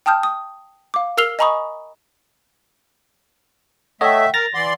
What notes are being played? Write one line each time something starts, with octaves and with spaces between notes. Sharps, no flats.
G5 A5 D#6 F6 G6
D#6
F5 D6
A#4 E6 F6 C7 F7 G7
D#5 G#5 A#5 B5 C#6 D#6
A3 A4 C#5 D#5 E5 F#5 G5
A#4 A6 A#6 F7
E3 D5 F#5 C6